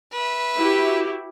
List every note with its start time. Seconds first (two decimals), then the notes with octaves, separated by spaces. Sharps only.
0.13 B4 E5
0.58 E4 F#4 G4